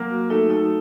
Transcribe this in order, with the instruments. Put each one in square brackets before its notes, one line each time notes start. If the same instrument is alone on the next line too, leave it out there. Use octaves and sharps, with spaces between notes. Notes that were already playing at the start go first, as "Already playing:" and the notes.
Already playing: [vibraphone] F#3 [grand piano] A#3 A#4
[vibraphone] F#4
[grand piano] A3 A4 [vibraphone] D#4
[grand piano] A3 A4 [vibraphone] D#4